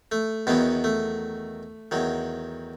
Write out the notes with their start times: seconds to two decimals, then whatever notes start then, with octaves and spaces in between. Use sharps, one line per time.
0.12 A3
0.47 E2 B2 D#3 F#3 B3
0.84 A3
1.91 E2 D#3 F#3